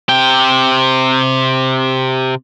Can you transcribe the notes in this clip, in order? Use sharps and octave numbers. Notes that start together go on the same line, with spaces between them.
C3 G5